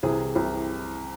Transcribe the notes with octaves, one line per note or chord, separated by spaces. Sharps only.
C2 C3 E3 G#4
C2 C3 E3